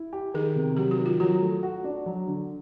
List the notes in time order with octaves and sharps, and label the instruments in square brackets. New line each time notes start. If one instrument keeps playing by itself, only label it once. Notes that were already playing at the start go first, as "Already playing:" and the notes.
Already playing: [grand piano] E4
G4
[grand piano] D#3 [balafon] G#4
[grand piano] C3
[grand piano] F#3 [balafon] G4
[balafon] F#4
[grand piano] D#3
[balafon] F4
[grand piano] F#3 [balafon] F#4
[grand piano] A3
F#4
D4
F#3
D3